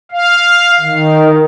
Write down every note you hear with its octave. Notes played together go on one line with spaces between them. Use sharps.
F5
D#3